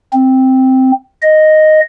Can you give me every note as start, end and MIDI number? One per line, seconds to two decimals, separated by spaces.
0.13 0.91 60
1.22 1.80 75